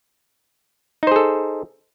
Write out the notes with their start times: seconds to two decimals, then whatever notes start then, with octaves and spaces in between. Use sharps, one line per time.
1.03 D#4
1.07 C5
1.12 G#4
1.16 A4